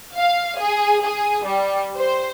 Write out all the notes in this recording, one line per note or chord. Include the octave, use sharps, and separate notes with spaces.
F5
G#4
G#4
G3
C5